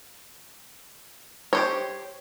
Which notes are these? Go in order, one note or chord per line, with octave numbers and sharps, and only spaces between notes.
G4 C5 C#5